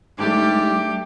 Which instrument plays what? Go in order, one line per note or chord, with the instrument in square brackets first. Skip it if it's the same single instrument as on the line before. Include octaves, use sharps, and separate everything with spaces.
[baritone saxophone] G#2 [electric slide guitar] G3 A3 D4 [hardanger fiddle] G4 [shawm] D5